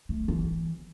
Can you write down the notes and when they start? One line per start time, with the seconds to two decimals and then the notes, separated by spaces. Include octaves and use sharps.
0.09 A3
0.28 E3